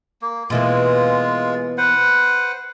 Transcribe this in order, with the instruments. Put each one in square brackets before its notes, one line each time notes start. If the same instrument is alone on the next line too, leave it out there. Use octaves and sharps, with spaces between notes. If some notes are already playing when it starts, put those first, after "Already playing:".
[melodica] A#3
[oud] B2 E3 A#3 [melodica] G#3 F4
[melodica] B4 C5 F#5